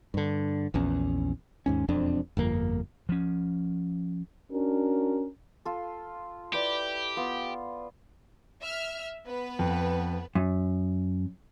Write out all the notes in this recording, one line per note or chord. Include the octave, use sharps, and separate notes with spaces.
G2 D3
A#1 E2 C#4
D#2 G#2 C#4
E1 F2 C4 D4
G1 F2 A#3
F3 C#4
C#4 D4 F#4 A#4
F4 A4
E4 G4 B4 D5
B3 F4
E5 F6
B3 B4
F2
F#2